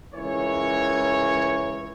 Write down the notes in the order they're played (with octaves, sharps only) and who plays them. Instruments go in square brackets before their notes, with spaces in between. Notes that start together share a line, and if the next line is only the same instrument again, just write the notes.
[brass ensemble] C#2 E3 A#4 C#5